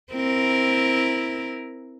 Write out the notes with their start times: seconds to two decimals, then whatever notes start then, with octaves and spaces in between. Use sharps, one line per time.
0.12 C4 E4 A#4